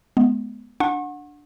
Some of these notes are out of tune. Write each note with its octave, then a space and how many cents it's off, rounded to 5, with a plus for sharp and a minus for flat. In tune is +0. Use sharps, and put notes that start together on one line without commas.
G#3 +35 B3 +0
D4 +0 F#5 -20 C#6 -40